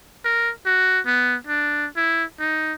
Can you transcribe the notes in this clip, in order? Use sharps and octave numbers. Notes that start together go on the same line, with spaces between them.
A#4
F#4
B3
D4
E4
D#4